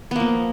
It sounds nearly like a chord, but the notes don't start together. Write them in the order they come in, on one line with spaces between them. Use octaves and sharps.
B3 A#3 F3